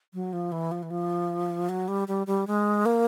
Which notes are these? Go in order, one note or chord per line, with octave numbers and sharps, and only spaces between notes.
F#3
F3
E3
F3
E3
F3
F#3
G3
G3
G3
G#3
A#3